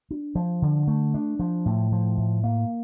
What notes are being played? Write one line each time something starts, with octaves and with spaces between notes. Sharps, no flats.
D4
F3
D3
A3
D4
F3
A2
F3
A2
A#3